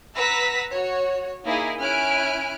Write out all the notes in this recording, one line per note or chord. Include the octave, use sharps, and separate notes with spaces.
B4 F#5 A#5 E6 A#6 B6
F#4 C#5
A#3 D#4 E4 G#4 A#4
C#4 E4 G#5 F6 F#6 D7